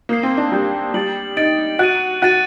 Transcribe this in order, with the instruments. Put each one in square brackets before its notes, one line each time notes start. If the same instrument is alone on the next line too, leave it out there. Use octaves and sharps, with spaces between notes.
[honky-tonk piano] A#3 [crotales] D#6 G6 C7
[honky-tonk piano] C4
D4
[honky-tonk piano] G3 [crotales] D#6 G6 C7
[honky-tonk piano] G3 [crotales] A6 D7 F#7
[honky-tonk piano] D#4 [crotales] A6 D7 F#7
[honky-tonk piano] F#4 [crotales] F#6 A6 D#7
[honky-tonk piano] F#4 [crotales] F#6 A6 D#7